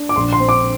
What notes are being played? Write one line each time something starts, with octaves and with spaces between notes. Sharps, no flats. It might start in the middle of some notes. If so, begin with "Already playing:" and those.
Already playing: D4
D6
A#1 C6
C6
C4
D6